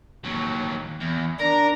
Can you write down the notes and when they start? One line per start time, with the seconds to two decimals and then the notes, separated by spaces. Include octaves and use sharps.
0.24 D#2 F#3
1.00 E2
1.40 D4 A#4 A#5